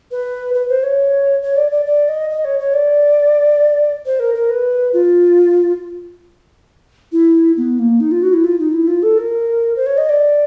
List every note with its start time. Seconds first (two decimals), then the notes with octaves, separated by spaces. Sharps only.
0.11 B4
0.54 B4
0.69 C5
0.83 C#5
1.43 C#5
1.56 D5
1.71 D5
1.86 D5
2.09 D#5
2.30 D#5
2.45 C#5
2.59 C#5
2.74 D5
4.06 C5
4.20 A#4
4.35 A#4
4.50 B4
4.93 F4
7.12 E4
7.57 B3
7.79 A#3
8.00 D#4
8.11 F4
8.22 F#4
8.33 E4
8.44 F4
8.59 D#4
8.73 E4
8.87 F4
9.03 A4
9.18 A#4
9.76 C5
9.86 C#5
9.98 D#5
10.09 D5